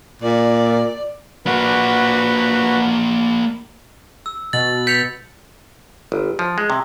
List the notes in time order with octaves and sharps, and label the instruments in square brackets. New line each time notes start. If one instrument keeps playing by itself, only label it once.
[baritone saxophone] A#2 [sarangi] D5
[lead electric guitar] A#3 D4 [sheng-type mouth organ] F#4 B4
[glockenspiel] E6
[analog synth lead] B2 [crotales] A6 [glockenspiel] F#7
[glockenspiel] G6 C#7 F7 [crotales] B6
[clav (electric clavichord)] G1
F3
G#3
C3